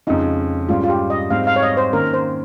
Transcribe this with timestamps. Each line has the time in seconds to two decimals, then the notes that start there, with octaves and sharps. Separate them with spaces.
0.07 F2 C#3 G#3 C#4 D#4 F4
0.69 G#2 G3 C#4 F4
0.83 F4
0.90 G4
1.10 D#5
1.30 G#2 G3 C4 D#4 F5
1.47 F5
1.56 C#5
1.62 D#5
1.77 C5
1.93 D#3 A#3 C#4 A#4
2.14 C5